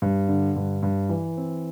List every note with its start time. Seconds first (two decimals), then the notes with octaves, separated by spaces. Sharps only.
0.02 G2
0.28 D3
0.56 G2
0.83 G2
1.09 E3
1.37 C4